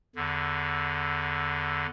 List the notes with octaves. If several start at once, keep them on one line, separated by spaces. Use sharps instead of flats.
E2 D3